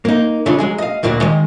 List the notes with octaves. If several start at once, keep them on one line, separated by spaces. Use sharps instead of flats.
A#3 D#4
C#3 A3 D4 F4
F#3 G#3 G#4
D#5 F5
D2 A#2 A#3 F#4 D5
D#3 G#3